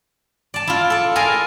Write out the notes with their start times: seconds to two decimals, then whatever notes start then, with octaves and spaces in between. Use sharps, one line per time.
0.54 D5 A5
0.67 E4 F4
0.90 A4 D5
1.15 F4 G#4 A#4 G#5 A#5